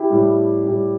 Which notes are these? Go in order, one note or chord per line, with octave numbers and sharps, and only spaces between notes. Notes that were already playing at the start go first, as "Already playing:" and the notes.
Already playing: E4 G4
A2 G3
A2 G3